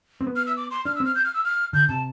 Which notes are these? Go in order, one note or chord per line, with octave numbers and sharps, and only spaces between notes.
C4
B3
F6
E6
D6
C6
D4 F6
E6
C4 F6
G6
F6
E6
F6
D3 G6
C3 A5